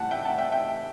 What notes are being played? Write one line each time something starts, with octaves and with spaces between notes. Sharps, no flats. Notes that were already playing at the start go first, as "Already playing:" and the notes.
Already playing: A2 G3 F#5 A5
E5 G5
F#5 A5
E5 G5
E5 G5